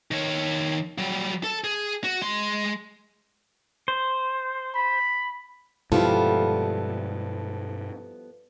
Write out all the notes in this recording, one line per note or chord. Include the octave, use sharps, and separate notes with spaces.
D#3 C#5
F#3 G3
A4
G#4
F#4
G#3 C6
C5
B5
G2 B2 F3 G3 G#3 B3 E4 A4